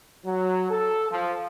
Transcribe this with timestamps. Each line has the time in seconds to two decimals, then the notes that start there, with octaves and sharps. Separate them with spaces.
0.25 F#3
0.70 A4
1.11 F3